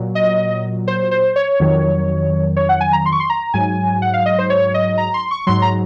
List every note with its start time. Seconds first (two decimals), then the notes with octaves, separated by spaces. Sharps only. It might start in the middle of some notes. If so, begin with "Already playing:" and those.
Already playing: A#2 F#3
0.15 D#5
0.88 C5
1.11 C5
1.36 C#5
1.60 F2 D#3 F#3
2.57 C#5
2.69 F#5
2.81 G#5
2.93 A#5
3.06 C6
3.12 C#6
3.20 C6
3.30 A#5
3.54 G#2 F#3 G#5
4.02 F#5
4.14 F5
4.26 D#5
4.38 C5
4.50 C#5
4.74 D#5
4.98 A#5
5.14 C6
5.31 C#6
5.47 G#2 F#3 C6
5.62 A#5